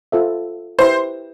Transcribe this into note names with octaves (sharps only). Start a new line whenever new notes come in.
F4 A4 C5 E5
E4 G4 B4 C5 E5